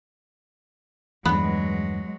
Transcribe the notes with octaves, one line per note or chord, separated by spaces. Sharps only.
E2 G2 F#3 G#3 B3